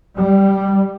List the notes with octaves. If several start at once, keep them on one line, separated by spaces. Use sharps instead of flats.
G3